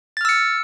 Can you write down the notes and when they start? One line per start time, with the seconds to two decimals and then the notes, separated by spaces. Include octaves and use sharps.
0.17 A6
0.21 F6
0.25 E6
0.29 C#7